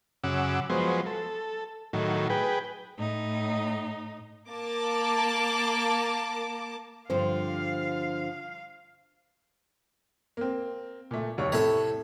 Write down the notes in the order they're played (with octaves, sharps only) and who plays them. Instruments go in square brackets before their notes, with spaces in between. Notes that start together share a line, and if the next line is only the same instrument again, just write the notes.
[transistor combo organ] F#2 C#3 F#5 D6 E6
F3 F#3 G#3 B3 C5
A4
A2 D#3 F#3
G#4 B4 G5
[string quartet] A2 D#4
[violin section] A#3 A5 D6
[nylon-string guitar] G2 D3 F3 [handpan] C5 [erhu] F5
[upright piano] A#3 C4
A#2 A3
F1 D#2 C#5
[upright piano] A2 C3 A3 [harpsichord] A4 C#5